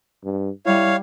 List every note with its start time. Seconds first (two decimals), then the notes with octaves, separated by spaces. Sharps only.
0.24 G2
0.66 G3 E4 C#5 F5